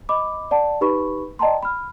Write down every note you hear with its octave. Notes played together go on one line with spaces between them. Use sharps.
D#5 B5 D6
D5 F#5 A5
D#4 G4 B4 B5 C#6
D5 D#5 G5 A5 A#5 C6
B5 F6